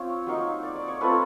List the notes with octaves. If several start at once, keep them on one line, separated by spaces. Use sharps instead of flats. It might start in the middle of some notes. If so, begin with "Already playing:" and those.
Already playing: C4 F4 C#5
F#3 A#3 D#4
D5
D5
C#5
A3 C4 F4 B4